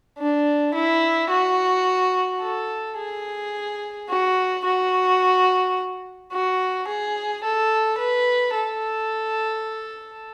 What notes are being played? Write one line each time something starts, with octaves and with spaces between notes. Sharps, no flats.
D4
E4
F#4
A4
G#4
F#4
F#4
F#4
G#4
A4
B4
A4